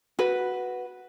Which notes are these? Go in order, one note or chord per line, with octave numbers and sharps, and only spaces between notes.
F#4 B4